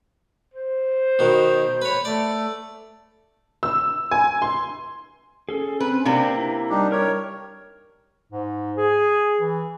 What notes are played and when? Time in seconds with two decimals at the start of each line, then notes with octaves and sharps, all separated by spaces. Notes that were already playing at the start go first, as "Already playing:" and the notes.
0.54 C5
1.19 B2 D#3
1.82 B4 C#5
2.05 A3 D5
3.63 E6
4.11 G#5
4.42 C6
5.49 C#4 G#4 A4
5.80 C4 B4
6.05 C3 A#3 D4 D5 G5
6.37 E4
6.70 G3 D4 D#4 G4
6.92 A#4 C#5
8.32 G#2
8.77 G#4
9.40 E3